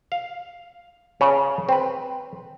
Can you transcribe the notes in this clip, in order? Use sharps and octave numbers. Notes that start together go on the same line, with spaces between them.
F5
C#3 C#4 C#5
C4 B4